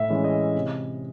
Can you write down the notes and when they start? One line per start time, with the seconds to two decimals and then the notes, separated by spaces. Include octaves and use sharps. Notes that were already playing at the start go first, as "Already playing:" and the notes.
Already playing: A2 E5
0.09 E3 G#3 C#4 E4
0.24 D#5
0.55 C3